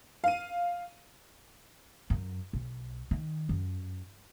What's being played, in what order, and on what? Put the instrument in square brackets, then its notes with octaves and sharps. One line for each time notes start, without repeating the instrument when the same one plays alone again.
[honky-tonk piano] F5 D#7
[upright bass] F#2
B1
D#3
F#2